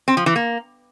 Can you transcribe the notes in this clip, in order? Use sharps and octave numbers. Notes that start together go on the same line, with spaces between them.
C4
F3
E3
A#3